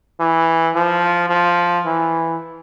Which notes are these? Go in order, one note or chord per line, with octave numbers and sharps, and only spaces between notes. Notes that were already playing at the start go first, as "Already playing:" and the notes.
E3
F3
F3
E3